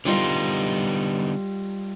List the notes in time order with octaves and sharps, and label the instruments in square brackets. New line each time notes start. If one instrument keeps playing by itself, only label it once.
[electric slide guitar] D3 B3 D#4 [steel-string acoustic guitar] G3 F4 D#5